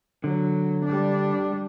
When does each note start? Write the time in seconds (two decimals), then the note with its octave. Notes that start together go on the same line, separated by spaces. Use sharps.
0.24 D3 F#3
0.85 G3 D4